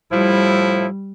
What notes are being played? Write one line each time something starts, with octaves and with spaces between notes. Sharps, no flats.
A2 F3 G3 E4